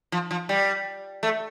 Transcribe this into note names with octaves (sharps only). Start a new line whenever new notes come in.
F3
F3
G3
A3